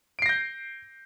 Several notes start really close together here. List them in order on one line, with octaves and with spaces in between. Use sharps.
D7 C7 A#6 G6